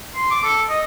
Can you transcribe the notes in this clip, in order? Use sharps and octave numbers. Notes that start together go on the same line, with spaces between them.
C6
D6
A4
D#5